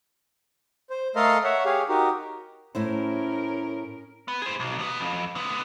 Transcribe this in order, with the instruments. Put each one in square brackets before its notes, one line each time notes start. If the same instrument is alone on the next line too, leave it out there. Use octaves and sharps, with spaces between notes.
[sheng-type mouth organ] C5
A3 A4 A#4 D#5 F5 C6
C#5 E5 F#5
G4 G#4 C#5 F5
D#4 F#4 G4 A#4
[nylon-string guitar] A2 E4 C5 [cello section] C#4 A#4
[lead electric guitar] B3
G#4 C5
B1
D#2 B3
F2
D3 B3